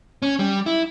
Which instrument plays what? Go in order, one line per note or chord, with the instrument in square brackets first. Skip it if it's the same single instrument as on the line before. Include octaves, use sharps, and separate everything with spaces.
[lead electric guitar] C#4
G3
E4